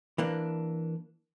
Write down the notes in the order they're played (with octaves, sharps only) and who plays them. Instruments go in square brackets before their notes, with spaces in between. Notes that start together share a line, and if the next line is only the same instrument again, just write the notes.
[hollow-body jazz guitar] E3 A#3 D4